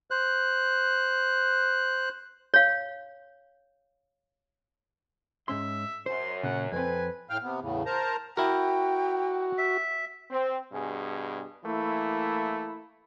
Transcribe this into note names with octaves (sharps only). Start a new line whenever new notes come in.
C5 F#6
C#5 F5
G#2 C#4 E5 C6
F#2 C5 C6
A#2 C#3 F#5
F2 C4 A4 B4 G#5
A2 F5 G5 F6
C3 B3
E2 A2 C#3
A#4 C5 A5 A#5
E4 F#4 A#4 G5
E5
C4
G2 B2 G#4
E3 A3 A#3 E4